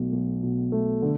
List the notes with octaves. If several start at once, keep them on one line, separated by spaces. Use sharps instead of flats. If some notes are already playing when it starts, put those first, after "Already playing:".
Already playing: B1 B2 A3
B1
B2
A3
D3